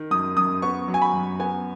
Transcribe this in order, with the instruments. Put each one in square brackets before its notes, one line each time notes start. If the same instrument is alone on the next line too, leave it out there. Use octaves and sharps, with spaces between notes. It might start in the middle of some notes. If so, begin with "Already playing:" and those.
Already playing: [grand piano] D#3
F#2 D#6
F#2 D#6
B3 C#6
F#3
G#5
B5
F#2
B3 G#5